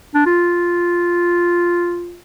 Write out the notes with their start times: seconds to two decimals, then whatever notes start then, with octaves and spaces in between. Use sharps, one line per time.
0.14 D4
0.26 F4